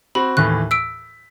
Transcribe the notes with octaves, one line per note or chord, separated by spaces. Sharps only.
C4 F#4 B5
D#2 A2 E3 F#6
E6 B6 D7